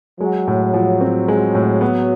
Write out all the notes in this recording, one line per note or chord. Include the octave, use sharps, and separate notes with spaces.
F#3 G#3
A2
F3
C4
G#3
A2
B3